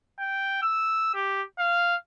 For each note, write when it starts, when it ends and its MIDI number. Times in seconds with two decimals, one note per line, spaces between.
0.19 0.61 79
0.63 1.10 88
1.14 1.43 67
1.59 1.96 77